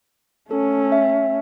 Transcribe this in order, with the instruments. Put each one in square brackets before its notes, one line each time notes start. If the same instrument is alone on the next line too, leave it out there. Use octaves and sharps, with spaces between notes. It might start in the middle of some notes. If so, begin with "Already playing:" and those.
[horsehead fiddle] A3 C#4 [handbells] A4
[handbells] E5